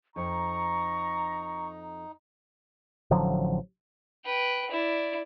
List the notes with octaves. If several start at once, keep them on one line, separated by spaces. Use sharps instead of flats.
F2 D#4 A#5 C#6
A1 D3 F3 F#3
B4 G5
E4 D5